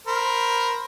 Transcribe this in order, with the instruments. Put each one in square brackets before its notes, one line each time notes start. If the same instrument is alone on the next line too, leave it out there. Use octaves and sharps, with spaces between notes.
[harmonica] A#4 C5 B5